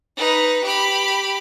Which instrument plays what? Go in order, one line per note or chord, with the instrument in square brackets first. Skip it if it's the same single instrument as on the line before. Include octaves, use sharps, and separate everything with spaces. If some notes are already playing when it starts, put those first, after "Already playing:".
[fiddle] D#4 B4
G4 B5